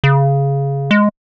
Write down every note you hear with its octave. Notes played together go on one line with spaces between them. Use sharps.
C#3
G#3